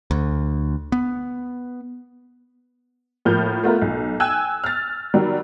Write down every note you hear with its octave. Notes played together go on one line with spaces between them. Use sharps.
D2
B3
A2 F3 A#3 F6 G6
A3 B3 F4 A#4
B1
G5 G#5 E6 F#6 G#6
F6 A6
D#3 F#3 G3